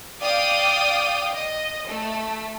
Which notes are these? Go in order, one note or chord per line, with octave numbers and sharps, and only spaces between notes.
D5 F5 G5 D6 D#6 G6
D#5
A3